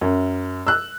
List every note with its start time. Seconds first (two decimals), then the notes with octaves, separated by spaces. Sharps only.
0.01 F#2
0.67 E6 F#6